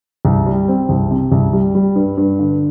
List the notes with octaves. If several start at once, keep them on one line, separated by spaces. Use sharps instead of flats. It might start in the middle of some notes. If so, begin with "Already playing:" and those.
C2
G3
C4
C2
C3
C2
G3
G3
G2
G2
D3